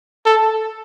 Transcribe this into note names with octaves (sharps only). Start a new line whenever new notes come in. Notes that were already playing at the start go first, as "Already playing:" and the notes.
A4